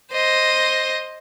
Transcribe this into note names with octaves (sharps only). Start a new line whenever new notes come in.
C5 D#5